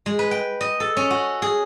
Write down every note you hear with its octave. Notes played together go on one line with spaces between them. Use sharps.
G#3
B4
G5
D#5
A4
C#4
F#4
G#4